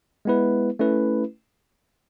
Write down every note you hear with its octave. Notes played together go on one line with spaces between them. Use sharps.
G#3 B3 E4 B4
A3 C#4 E4 B4